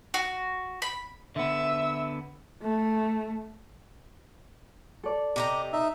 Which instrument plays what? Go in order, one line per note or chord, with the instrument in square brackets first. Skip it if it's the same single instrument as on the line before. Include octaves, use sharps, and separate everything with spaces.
[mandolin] F#4
B5
[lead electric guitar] D3 B3 [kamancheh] E5 E6
[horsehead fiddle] A3
[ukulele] A4 D5
[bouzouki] C3 D#5 A#5 [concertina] G4
[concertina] D#4 E5